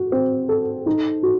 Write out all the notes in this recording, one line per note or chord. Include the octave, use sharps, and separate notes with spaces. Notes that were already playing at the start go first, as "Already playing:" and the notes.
Already playing: F#4
C4
A4
D#4
F#4